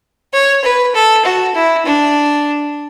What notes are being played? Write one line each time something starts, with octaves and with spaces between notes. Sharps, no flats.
C#5
B4
A4
F#4
E4
D4